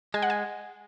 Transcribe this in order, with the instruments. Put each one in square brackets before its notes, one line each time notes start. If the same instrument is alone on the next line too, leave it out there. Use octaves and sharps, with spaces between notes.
[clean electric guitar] G#3 [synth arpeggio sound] G#5
[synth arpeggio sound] F#5
G#5